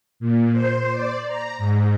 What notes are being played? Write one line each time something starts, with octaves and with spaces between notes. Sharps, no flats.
A#2
C5
D5
A#5
G#2